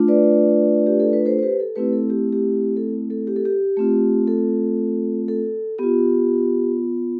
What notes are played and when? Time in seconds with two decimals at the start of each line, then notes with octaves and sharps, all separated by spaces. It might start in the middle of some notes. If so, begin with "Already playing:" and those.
Already playing: A3 D4 F4
0.08 B4 D5
0.87 G4
1.00 A4
1.13 B4
1.26 A4 C5
1.39 C5
1.42 G4 B4
1.60 A4
1.76 A3 C4 E4 G4 B4
1.93 A4
2.10 G4
2.33 G4
2.77 A4
3.10 A4
3.27 G4
3.36 A4
3.45 G4
3.77 A3 C4 F4
4.27 A4
5.28 A4
5.78 B3 F4 G4